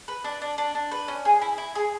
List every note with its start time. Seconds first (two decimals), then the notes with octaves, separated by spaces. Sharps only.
0.08 B4
0.24 D4
0.42 D4
0.58 D4
0.75 D4
0.92 B4
1.08 C#4
1.25 G#4
1.42 E4
1.58 E4
1.75 G#4